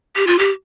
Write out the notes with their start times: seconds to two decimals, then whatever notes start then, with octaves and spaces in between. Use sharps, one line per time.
0.16 G4
0.27 F4
0.39 G4